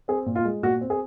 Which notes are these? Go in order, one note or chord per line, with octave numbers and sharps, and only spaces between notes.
C4 G#4
A#2
F4
G#3
A#2 F#4
C4
G#4